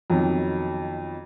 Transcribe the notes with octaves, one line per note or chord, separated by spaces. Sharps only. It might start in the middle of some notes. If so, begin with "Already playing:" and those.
F2 B2 D#3 F#3